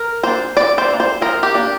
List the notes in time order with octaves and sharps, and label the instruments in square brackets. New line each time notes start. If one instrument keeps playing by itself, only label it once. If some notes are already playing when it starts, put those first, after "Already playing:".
Already playing: [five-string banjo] A#4
A#3 D4 C5
F3 D5
C5
A#3 D4
C5
F3 A#4
G4
A#3 D4